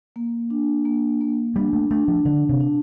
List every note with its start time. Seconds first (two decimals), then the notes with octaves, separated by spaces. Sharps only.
0.16 A#3
0.50 D4
0.85 A#3
1.21 A#3
1.56 G3 D4
1.73 A3
1.91 A3 D4
2.08 F3
2.25 D3 D4
2.49 C3
2.60 D4